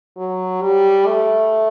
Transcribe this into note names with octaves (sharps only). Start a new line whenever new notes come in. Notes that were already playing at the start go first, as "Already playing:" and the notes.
F#3
G3
A3